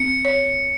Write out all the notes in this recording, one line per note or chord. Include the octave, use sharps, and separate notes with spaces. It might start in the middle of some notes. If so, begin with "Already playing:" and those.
Already playing: C4 C#7
C#5